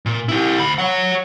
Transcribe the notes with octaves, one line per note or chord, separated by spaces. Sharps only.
A#2
E4 G4
D2 B5
C#5 F#5